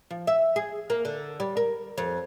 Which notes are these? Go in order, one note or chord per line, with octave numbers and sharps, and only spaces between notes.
F3
E5
G#4
A#3
D3
G3
A#4
F2